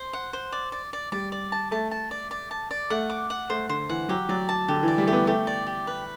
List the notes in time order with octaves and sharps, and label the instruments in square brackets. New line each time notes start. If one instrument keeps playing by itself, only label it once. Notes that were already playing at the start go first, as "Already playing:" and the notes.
Already playing: [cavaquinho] C5
F#5
C5
D5
D5
D5
[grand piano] G3 [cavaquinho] D5
[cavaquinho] D5
A5
[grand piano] A3 [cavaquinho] A5
[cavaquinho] A5
D5
D5
A5
D5
[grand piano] A3 [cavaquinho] F#5
[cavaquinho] D6
F#5
[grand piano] A3 [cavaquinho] C5
[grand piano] D3 [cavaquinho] C5
[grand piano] E3 [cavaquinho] F#5
[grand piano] F#3 [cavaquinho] G4
[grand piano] F#3 [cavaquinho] D5
[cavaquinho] A5
[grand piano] D3 [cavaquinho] G4
[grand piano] E3
[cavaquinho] D5
[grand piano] G3
[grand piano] A3 [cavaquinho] G4
[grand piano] B3
[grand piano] A3 [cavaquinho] G4
[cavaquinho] D5
G4
B4